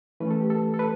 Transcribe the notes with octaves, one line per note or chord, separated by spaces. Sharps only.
E3 A3 C#4 B4
A4
G4
A4
A4
B4